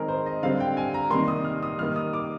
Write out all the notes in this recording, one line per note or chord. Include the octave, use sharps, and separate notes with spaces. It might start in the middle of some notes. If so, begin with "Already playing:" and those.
Already playing: D#3 G#3 C4 G#4 A#4
C5
D#5
D3 G3 C4 F5
G5
G#5
A#5
C3 D#3 G3 A#3 C6
D#6
F6
D#6
D#3 G3 A#3 F6
D#6
D6